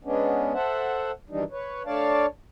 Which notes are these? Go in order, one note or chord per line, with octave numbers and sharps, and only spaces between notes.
G#3 B3 C#4 D4
A4 C5 E5 F#5
F#2 D#3 E3 G3 D4 D#4
B4 C#5
A3 D4 C#5 D5 F5 A5